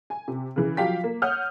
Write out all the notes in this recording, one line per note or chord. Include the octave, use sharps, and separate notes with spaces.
G#5
C3
C#3 E3
F3 F#3 G4 F5 G5 B6
A#3
C#5 F#5 D#6 F6 G6